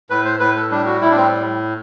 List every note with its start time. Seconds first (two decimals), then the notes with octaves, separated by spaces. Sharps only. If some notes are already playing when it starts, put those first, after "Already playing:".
0.10 A2 B4
0.25 C5
0.40 A2 B4
0.56 A4
0.71 G3 D4
0.86 F#4
1.01 A2 E4
1.10 D4
1.17 C4